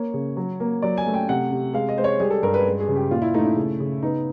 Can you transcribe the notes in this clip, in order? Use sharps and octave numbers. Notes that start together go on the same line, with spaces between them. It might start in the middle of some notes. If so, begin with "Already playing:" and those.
Already playing: A#3 C#5
C#3
F#3
A#3
F#3 D5
G#5
A3
G5
C3 F#5
C3
G#3 F5
D#5
G#3 C5
C#5
G3 G#4
A4
G2 A#4
B4
G#3
G#4
C#3
G4
A#2 F4
E4
A3 D#4
E4
C#3
C#3
B3 D#4